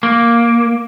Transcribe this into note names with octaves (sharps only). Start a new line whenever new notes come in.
A#3